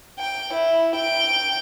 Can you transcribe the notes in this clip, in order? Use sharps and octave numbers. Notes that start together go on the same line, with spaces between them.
G5
E4
G5